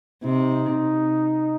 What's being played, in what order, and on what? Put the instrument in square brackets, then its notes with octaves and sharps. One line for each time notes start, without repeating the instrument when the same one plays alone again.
[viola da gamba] C3 [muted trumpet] D#4